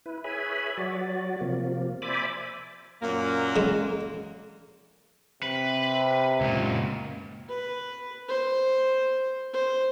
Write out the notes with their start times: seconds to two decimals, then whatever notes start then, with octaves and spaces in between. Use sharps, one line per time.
0.06 E4 B4
0.24 G#4 B4 C#5 E5 G#5 B5
0.78 F#3 F#4 D5
1.41 C3 F3 A#3
2.02 C5 D5 E5 G#5 B5 D6
3.02 F#2 A#2 A#3
3.56 C#3 G#3
5.43 C3 B4
6.41 C#2 A#2
7.49 B4
8.28 C5
9.54 C5